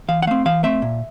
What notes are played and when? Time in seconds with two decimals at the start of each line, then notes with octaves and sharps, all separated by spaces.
0.08 E3 F5
0.22 F#5
0.27 A3 C4 F5
0.46 E3 F5
0.63 A3 C4 E5
0.82 A#2